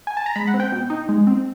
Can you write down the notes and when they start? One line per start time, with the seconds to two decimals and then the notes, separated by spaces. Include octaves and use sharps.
0.07 G#5
0.17 A5
0.26 A#5
0.36 G#3 B5
0.47 F#5
0.54 C4
0.60 G5
0.72 B2
0.90 D#4
1.09 G#3
1.27 C4